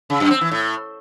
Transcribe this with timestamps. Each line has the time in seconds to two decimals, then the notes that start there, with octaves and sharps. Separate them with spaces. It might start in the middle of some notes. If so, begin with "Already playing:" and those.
0.10 C#3
0.20 F#2
0.31 C4
0.41 E3
0.51 A2